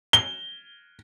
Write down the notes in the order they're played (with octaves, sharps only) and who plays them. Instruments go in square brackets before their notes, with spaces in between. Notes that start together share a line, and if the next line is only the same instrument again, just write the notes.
[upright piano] G7